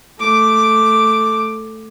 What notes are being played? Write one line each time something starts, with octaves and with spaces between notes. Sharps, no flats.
A3 D6